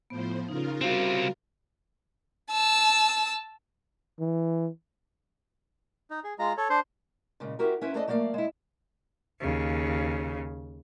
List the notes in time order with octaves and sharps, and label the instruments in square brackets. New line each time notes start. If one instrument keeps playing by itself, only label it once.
[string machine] A2 F3 C5 [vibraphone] B3
[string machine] C#3 F4 A#4 [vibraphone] D#4
[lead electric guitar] G3 C4 [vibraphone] F#4 F5
[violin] A5 E6
[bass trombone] E3
[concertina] D#4
G#4
G#3 F4 A#5
A4 C#5
D4 C5 C6
[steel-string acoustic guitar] A#2 C#3 G#3
C4 E4 F#4 G4 A#4
C#4 E4 B4 C5
A3 A4 B4 C5 D5 D#5
F#3 A3 A#3 D5 F5
G#3 E4
[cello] D#2 C#3